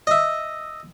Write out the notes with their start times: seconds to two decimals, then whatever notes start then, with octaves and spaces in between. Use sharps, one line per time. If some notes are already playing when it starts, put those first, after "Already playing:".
0.07 D#5 E5